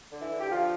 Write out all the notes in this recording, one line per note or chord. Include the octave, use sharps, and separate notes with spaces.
D3
E3 E4
D3
G4
D3 F3 F4